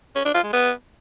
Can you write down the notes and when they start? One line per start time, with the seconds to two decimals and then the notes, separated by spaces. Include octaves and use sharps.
0.16 C#4
0.25 D4
0.34 F4
0.44 G#3
0.53 B3